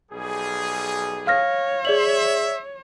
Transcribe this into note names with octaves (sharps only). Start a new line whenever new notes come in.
B1 G3 G#4
C#5 F5 F6 A#6
G#4 D5 E5 F#7